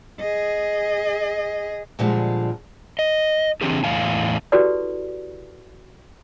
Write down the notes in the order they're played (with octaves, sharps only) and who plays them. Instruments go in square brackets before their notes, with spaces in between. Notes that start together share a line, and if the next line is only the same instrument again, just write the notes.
[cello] G#4 D#5
[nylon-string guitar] A#2 D3 F3 G3 G#3
[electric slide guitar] D#5
C#3 E3 C4 D4 G4 G#4
E2 A2 C#3 E3 F5 G#5
[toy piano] E4 F#4 G4 A4 B4 D5